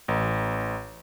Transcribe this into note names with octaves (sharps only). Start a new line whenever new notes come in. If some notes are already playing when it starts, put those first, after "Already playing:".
A1